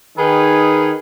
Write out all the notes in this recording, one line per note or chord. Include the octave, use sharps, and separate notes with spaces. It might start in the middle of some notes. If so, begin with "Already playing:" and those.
D#3 G#4 B4